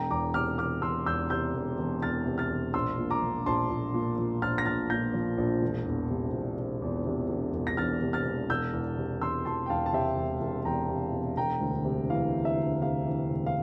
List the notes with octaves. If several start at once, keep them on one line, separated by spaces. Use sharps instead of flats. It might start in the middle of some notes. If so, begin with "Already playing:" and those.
Already playing: E1 G5 A#5
E2 A#5 D6
C3 D6 F6
E1 D6 F6
E1 C6 E6
E2 E6 G6
C3 E6 G6
E1
E1
E2 F6 A6
C3
F6 A6
E1
A#1 C6 E6
A#2
A#5 D6
F3
A#1 A5 C6
A#1
A#2
F3
A#1 F6 A6
A#6
A#1 F6 A6
A#2 G6 A#6
F3
A#1
E1
E2
C3
E1
E1
E2
C3
E1
E1
A#6
E2 F6 A6
C3
F6 A6
E1
E1 E6 G6
E2
C3
E1 C6 E6
E1 A5 C6
G5
E2 F5 A5
A5
C3 E5 G5
E1
E1
E2 G5 A#5
C3
E1
E1 G5 A#5
D2
C3
E3 F5
E1
E5
D2
C3 F5
E3
E1
F5